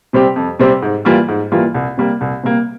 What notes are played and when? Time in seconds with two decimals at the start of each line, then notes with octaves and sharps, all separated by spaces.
0.13 C3 G3 C4 G4
0.36 F2
0.59 C3 G3 C4 G4
0.82 G#2
1.05 E3 G3 A#3 F4
1.28 G#2
1.52 E3 G3 A#3 F4
1.74 C2
1.98 C3 G3 A#3
2.21 C2
2.44 C3 G3 A#3